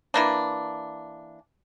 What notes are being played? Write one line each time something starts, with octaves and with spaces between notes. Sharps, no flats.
E3 A#3 D4